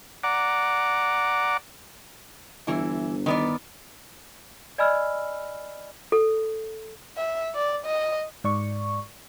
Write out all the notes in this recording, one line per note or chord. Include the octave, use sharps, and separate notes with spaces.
D5 F#5 A#5 D6
G1 E3 E4
D#3 B3 D5
D5 D#5 G#5 B5 E6 F6
A4
E5
D5
D#5
G#2 D5 C#6